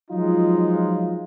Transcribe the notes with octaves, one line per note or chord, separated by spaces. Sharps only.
F3 F#3 G#3 D#4 F4